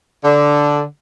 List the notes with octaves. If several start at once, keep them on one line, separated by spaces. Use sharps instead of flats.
D3